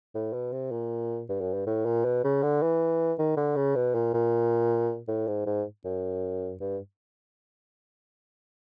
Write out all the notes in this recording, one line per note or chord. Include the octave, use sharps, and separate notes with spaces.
A2
B2
C3
A#2
G2
F#2
G2
A2
A#2
B2
C#3
D3
E3
D#3
D3
C#3
B2
A#2
A#2
A2
G#2
G#2
F#2
G2